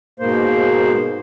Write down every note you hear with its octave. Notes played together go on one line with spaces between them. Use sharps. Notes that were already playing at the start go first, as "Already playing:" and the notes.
G#2 B2 A#3 C5